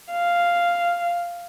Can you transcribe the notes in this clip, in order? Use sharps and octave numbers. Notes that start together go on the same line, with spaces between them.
F5